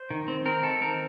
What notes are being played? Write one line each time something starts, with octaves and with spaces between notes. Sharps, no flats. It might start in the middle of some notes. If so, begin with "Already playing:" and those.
Already playing: C5
D#3
C4
C4 A#4
D#3 A4
C4 A#4